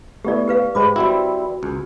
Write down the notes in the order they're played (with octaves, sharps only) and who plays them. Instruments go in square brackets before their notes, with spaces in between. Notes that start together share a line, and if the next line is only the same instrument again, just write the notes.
[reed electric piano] A3 B3 E4 [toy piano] G4 D5
[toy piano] G4 B4 F5
[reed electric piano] G#2 G#3 G4 [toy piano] C5 B5 D6
[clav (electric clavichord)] G3 C4 E4 [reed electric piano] F#4
[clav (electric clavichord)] C#2